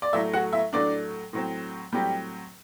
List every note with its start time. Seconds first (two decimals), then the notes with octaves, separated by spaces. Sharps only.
0.02 D5
0.13 A2 F#3 A3 E4 E5
0.33 F#4 F#5
0.53 E4 E5
0.73 A2 F#3 A3 D4 D5
1.33 A2 F#3 C4
1.92 A2 F#3 G3 C4 G4